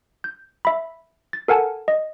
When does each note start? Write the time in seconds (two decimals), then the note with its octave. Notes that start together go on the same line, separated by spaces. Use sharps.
0.24 G6
0.65 E5 B5
1.33 A6
1.48 A4 A#4 F#5 G#5 A5
1.88 D#5